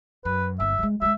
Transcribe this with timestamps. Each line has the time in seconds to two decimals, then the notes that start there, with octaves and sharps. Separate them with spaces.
0.25 F#2 B4
0.60 G1 A#3 E5
0.79 G3 G#3
1.02 F#3 G#3 E5